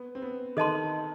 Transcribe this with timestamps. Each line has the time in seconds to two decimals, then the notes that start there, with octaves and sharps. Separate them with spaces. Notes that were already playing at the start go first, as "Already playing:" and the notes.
Already playing: B3
0.15 C4
0.22 B3
0.57 D#3 A4 D#5 A5 C6